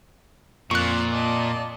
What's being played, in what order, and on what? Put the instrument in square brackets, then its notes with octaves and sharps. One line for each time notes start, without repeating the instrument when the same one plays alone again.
[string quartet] F2 D5 [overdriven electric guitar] A#2 [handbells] C#6 F#6
[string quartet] D5 D#5 A5